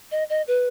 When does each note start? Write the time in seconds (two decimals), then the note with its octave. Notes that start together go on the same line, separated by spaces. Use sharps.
0.11 D#5
0.30 D#5
0.48 B4